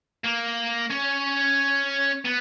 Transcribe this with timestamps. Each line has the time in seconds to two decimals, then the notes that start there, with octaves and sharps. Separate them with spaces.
0.24 A#3
0.91 C#4
2.25 B3